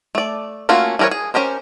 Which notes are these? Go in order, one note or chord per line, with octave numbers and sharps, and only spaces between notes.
A3 D5
A3 A#3 C#4 F4 F#4
E3 G3 A#4 B4 C#5
G#4
C#4 G4 A#4 C5